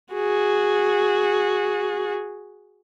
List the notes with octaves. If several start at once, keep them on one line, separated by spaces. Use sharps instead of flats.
F#4 G#4